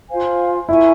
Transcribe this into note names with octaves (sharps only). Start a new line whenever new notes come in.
F4 C5 F5 G#5
E4 A#4 E5 G#5 C#6